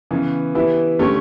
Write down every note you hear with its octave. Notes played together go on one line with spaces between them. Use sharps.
C#3 E3 B3
E3 B3 E4 G4
D3 A3 C#4 G4